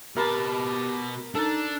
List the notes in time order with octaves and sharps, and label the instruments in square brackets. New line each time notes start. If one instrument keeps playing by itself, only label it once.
[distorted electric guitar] B2 A5 [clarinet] G4 [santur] A#4 B5
[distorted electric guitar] D4 [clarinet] D#4 [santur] A4